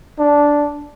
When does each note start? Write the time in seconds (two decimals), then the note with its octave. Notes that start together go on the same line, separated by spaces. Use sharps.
0.19 D4